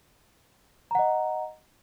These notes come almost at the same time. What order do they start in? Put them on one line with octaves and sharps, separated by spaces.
A#5 F#5 D#5